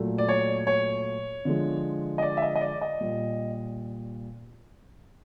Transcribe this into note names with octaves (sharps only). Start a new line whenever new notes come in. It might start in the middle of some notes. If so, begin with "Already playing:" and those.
Already playing: A#2 F#3 A3
D5
C#5
C#5
D3 F3 G#3
D#5
D5
E5
D#5
D#5
D5
D#5
A#2 G3